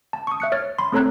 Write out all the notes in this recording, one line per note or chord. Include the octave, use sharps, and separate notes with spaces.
A5
C#6 D#6
E5 F#6 C#7
C#5 F6 A6
B5 C6
A3 C4 A4 C#5 A#5 F#6